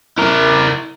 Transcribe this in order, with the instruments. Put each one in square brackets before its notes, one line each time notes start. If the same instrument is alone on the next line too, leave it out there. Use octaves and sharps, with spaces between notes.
[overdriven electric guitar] E4 A#4